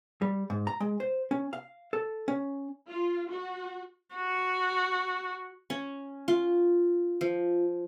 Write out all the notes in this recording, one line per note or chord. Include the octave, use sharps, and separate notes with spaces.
G3
G#2
A#5
G#3
C5
C#4
F5
A4
C#4
F4
F#4
F#4
C#4
F4
F3